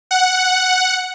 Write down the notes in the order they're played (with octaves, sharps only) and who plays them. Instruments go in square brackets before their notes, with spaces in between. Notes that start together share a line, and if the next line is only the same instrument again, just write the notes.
[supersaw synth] F#5